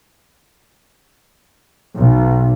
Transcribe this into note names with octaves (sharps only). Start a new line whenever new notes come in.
B1